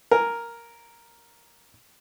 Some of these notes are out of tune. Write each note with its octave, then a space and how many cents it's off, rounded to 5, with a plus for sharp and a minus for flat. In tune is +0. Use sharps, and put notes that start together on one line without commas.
A#4 +0 G#5 +0